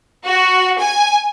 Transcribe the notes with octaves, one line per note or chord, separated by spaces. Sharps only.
F#4
G#5